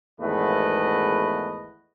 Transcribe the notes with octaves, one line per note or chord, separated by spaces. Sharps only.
G#1 E2 A3 B3 B4 D#5